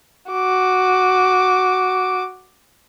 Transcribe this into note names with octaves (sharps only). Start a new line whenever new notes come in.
F#4 D6